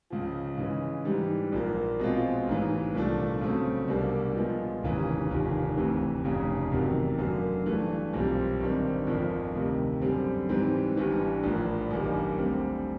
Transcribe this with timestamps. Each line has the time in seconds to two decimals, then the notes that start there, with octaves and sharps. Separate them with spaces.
0.10 C#2 C#3 F3
0.57 C#3 E3 G#3
1.05 G#2 E3 G3
1.52 A#1 A#2 F3 A#3
1.99 B2 G#3 C4 F4
2.47 A1 G#2 E3
2.94 C2 A#2 F3 A3 D4
3.41 C#3 F#3 A3 C4
3.88 C2 B2 G3 A#3 D4
4.35 A#2 F3 G#3 B3
4.83 F1 D#2 C#3 E3
5.30 F1 D#2 D3 F3
5.77 D2 C3 E3
6.24 F1 F2 C#3
6.71 E2 C3 D#3 F#3
7.19 F#2 D3 F#3 A#3
7.66 G2 E3 A3
8.13 B1 A#2 G3 C4
8.60 G#1 G2 D#3 G3 C4
9.07 G1 F2 D3 F3 A#3
9.55 D2 C3 D#3
10.02 F#2 D3 G3 C4
10.49 G#2 E3 G3 C4
10.96 G1 G2 E3 G3
11.43 A#1 A2 F3 A#3
11.91 G1 F#2 D#3 G3 A#3
12.38 D2 D3 G3 C4